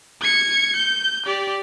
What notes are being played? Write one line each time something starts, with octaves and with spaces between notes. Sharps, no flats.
G#6 C#7
G6
G4 D5